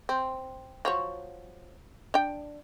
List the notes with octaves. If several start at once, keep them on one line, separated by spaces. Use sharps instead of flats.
C4
F3 F#3 C#5
D4 G5